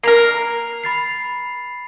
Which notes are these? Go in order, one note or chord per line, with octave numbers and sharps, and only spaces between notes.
A#3 A#4 C7 F7
B5 A6 C7